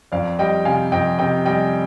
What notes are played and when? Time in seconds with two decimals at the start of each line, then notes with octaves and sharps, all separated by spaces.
0.12 F2 D5 F5
0.39 G3 D#5 G5
0.65 C3 F5 G#5
0.92 F2 D#5 G5
1.19 C3 D#5 G5
1.45 G3 D#5 G5